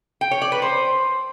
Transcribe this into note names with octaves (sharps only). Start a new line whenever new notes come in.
G5
C#5
D5
B4
C5